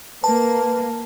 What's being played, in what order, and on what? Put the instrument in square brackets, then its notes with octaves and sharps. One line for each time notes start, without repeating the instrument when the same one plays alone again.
[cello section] A#3 [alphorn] B4 [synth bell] A5